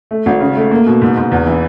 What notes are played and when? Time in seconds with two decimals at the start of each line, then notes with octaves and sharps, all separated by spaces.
0.11 A3
0.26 G#1
0.40 C#3
0.56 A3
0.71 A#3
0.86 B2
1.01 G#2
1.17 G#2
1.32 E2
1.46 E3